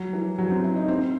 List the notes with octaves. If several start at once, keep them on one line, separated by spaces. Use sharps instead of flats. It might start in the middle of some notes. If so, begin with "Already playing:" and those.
Already playing: F#3
E3
F#3
C4
E4
D#4
C4